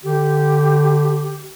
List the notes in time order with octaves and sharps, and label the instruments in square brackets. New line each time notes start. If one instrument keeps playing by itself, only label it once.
[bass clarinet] D3 [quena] G4